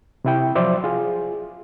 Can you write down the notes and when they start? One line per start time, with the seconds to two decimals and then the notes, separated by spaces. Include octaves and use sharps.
0.25 C3 E4 G5
0.55 F3 F#3 C5 D5 E5
0.84 F4 G#4